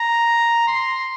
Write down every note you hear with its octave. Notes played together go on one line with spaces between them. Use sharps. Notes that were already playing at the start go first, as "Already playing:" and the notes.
Already playing: A#5
C6